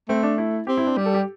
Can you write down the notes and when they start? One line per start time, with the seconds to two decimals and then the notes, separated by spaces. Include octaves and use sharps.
0.09 A3 C4
0.23 D4
0.38 E4
0.67 C4 G4
0.77 E4
0.87 D4
0.97 G3 G4
1.06 A4
1.14 G4